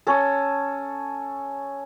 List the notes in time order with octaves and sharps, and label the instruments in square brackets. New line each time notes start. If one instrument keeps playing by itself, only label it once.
[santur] C#4 A4